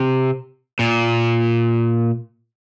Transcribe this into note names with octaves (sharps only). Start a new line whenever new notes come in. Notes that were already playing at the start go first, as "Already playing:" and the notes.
Already playing: C3
A#2